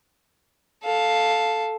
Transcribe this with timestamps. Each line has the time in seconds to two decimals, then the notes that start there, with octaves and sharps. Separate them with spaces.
0.83 A4 F5